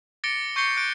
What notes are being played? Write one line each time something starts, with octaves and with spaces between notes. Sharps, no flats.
D6 A6 A#6 C#7 D7 G7
C#6 G6 C7 C#7 G7
C#6 F#6 G6 D7